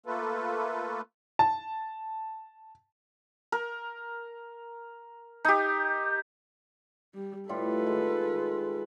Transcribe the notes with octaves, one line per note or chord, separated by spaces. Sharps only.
A3 A#3 F4 A4 B4
A5
A#4
D#4 G4
G3
A2 G3 F4 A4 B4
D#3 G#3